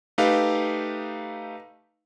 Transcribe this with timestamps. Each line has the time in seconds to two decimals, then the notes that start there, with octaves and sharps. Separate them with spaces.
0.18 A3 D#4 G4 B4 F5